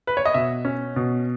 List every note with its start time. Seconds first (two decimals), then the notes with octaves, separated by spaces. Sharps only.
0.07 B4
0.17 C#5
0.25 D#5
0.34 B2 E5
0.65 C#4
0.96 B2